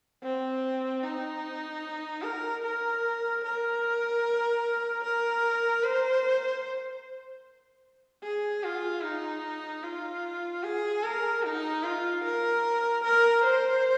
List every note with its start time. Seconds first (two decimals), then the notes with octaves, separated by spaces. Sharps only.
0.23 C4
1.03 D#4
2.23 A#4
2.63 A#4
3.44 A#4
5.03 A#4
5.83 C5
8.23 G#4
8.64 F4
9.03 D#4
9.83 F4
10.63 G#4
11.03 A#4
11.43 D#4
11.83 F4
12.24 A#4
13.04 A#4
13.44 C5